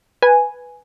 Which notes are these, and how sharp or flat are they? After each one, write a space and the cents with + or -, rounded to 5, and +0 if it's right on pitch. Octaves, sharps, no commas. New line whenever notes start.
B4 +0 G#5 +0